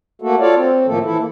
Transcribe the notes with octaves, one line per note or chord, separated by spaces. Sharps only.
A3 A#3 F#4 A4
F4 A4 C#5 D5 F5
C4
A2 D#3 F3 A3 A#3 A4
E3 E4 A4
A#3